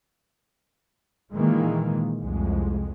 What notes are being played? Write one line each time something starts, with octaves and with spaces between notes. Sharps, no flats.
A#2 D#3 E3 G#3 A#3
C2 F2 G#3